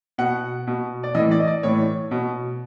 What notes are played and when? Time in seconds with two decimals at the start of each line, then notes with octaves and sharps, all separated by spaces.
0.18 B2 F#5
0.67 B2
1.03 D5
1.14 A2 E3 D#5
1.31 D5
1.40 D#5
1.47 D5
1.63 A2 E3 C#5
2.11 B2